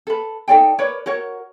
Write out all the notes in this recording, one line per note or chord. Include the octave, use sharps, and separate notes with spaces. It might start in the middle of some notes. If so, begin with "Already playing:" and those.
A4 B4
D#4 A4 D5 G5
A#4 B4 C#5 D5
F#4 A#4 C#5